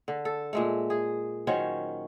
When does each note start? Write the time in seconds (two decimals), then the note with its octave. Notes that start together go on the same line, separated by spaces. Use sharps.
0.08 D3
0.25 A4
0.53 A#2 G#3 A3
0.90 G#4
1.47 D#3 F#3 C#4 C5